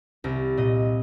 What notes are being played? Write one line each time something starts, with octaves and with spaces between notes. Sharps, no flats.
C2 A#4
A#2 D#5